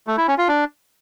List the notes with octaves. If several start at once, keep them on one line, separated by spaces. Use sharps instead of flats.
A3
E4
C#4
F4
D4